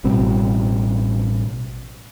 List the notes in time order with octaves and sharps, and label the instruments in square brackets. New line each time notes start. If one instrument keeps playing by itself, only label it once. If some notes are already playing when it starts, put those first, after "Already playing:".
[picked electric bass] A1 B2 G3 C4